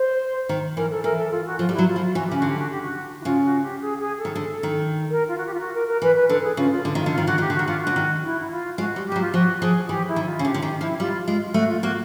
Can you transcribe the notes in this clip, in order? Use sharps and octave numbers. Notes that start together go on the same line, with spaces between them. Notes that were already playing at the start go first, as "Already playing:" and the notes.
Already playing: C5
D#3
E3 A#4
A4
E3 A#4
A4
F4
F#4
F3 F4
G3
E4
F#3
F4
F3
F4
E3 F#4
C#3 G4
D3 F#4
G4
F#4
G4
F#4
E4
C#3 F4
F#4
G4
G#4
G#4
A4
D#3
D3
D#3
A#4
F4
F#4
G4
F4
F#4
A#4
A#4
E3 B4
B4
D3 A4
G#4
C#3 F4
F4
D3
D#3 F4
D3
F4
D#3
D3 F#4
D#3 G4
D3
D#3 F#4
D3 F4
F#4
D3
D#3
E4
E4
F4
G#3 F#4
G3
G4
G3
F#3
F4
F3 F#4
F3 G#4
E3 G4
E4
D#3
F4
C#3
D3 G4
D3
D#3 G4
F3 E4
G3 F4
G#3 F4
F4
A3 F#4
F4
A#3 F#4